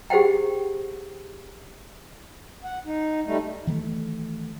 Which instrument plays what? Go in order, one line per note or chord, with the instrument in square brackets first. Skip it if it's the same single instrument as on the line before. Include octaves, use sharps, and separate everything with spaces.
[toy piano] G4 G#4 C5 F#5 G5
[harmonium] F#5
D#4
G3 A3 D#4
[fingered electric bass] D#3 E3 G3 A3